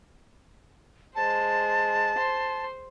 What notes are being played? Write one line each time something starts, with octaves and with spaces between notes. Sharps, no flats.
G#3 C5 A5
C5 C6